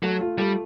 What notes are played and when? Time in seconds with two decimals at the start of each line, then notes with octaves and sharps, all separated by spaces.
0.02 F#3 A3
0.21 F4
0.38 G3 A3